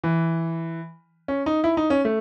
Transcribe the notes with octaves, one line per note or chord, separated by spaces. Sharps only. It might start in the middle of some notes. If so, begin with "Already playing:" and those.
E3
C#4
D#4
E4
D#4
C#4
A3